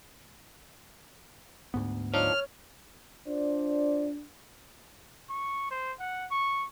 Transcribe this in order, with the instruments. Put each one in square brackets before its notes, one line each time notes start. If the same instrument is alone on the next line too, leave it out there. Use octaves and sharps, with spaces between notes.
[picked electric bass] D2 G#2 B3
[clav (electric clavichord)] F3 D4 D#4 [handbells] C#5 [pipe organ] F6
[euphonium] D4 [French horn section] F4 C5 D5
[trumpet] C#6
C5
F#5
C#6